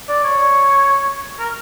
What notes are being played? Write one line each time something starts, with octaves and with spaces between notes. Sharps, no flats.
D5
C#5
A#4